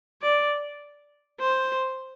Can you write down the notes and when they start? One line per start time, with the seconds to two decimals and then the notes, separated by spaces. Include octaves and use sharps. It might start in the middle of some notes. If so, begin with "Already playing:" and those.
0.22 D5
1.40 C5